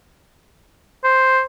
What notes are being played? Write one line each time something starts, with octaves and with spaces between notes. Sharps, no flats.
C5